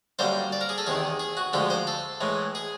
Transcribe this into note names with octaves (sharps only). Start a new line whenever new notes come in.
F#2 D3 G3 A#3 C5
D5
A#4
G#4
A4
E2 C3 D#3 G#4
G#4
F#4
D2 D3 F3 G#3 G4
C5
A4
A2 E3 G#3
G#4